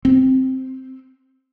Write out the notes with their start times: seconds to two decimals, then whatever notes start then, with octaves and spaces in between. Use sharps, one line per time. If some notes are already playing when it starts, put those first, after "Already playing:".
0.05 C4